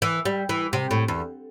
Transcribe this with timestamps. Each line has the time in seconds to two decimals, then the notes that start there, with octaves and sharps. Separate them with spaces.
0.02 E3
0.25 G3
0.49 E3
0.73 C3
0.91 A2
1.08 E2